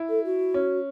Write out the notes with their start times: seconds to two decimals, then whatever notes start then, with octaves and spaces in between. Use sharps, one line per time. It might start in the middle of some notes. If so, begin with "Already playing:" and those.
Already playing: E4
0.09 A4
0.24 F#4
0.54 C#4